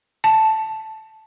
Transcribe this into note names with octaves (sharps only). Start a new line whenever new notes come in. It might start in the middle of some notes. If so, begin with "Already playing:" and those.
A5